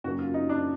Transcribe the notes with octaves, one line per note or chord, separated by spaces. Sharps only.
F#2 C#3 F#3 A#3 C#4 F#4
F4
D#4
D4